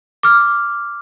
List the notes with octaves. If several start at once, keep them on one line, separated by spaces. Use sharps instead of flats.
D6 F6